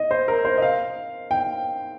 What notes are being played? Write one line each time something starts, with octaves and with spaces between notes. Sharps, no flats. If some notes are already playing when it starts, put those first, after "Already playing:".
Already playing: D#5
C5
A#4
C5
D#5
F5
G5